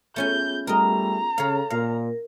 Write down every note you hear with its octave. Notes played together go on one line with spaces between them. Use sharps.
A3 B3 C#4 F4 G#4 G#5 G6
G3 A3 A#4 D#5 A#5
C#3 A4 C#5 F5
A#2 A#4 F5